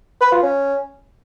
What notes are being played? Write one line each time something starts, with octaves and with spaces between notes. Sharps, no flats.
B4
F4
C#4